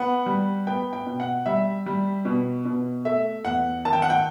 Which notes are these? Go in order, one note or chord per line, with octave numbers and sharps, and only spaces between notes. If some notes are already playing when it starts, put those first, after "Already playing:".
Already playing: B3 F#5
G3
B3 G5
G5
B2
F#5
G3 E5
G3
B2
B2
A3 E5
E2 F#5
D#3 A5
G5
F#5
G5